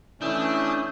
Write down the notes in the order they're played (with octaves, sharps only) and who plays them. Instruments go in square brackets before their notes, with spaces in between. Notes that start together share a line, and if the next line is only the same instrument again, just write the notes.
[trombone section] E3 A3 E4 [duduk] C#4 [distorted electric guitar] D4 [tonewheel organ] D#6 E6 G6